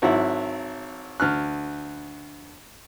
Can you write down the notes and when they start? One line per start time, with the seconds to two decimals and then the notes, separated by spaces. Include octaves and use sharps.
0.02 G#1 F#3 E4 F#5
1.20 D2 F6 F#6